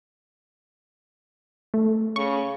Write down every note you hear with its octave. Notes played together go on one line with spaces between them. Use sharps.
A3
C#3 C#6